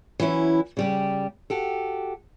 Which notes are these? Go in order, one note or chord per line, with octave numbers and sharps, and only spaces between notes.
E3 F#3 C#4 E4
C#3 G3 G4
F#4 G4 A4